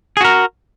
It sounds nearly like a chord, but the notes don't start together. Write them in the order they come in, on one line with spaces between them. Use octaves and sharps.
G#4 F#4 A#4